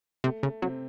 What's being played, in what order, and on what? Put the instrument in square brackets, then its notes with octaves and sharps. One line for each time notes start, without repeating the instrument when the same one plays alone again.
[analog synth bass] C3 [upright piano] A3
[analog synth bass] C#3 [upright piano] A3
[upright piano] C3 C4 [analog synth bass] F#3